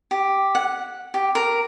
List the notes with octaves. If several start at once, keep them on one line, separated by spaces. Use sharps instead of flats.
G4
F#5
G4
A#4